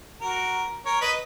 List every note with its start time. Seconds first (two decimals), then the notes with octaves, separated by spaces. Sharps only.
0.21 F#4 A#4
0.86 A#4 C#5
1.01 B4 D#5